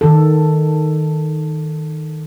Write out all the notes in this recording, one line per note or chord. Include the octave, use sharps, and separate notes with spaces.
D#3 A4